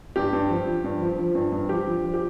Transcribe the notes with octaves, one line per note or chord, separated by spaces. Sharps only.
G2 G4
G2
F3
F3
G2
F3
F3
G2
G2
F3 G4
F3
F3
G4